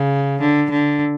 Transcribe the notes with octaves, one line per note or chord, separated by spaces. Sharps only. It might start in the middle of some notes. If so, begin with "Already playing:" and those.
Already playing: C#3
D3
D3